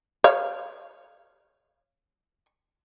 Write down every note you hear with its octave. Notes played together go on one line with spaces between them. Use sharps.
C#5 F5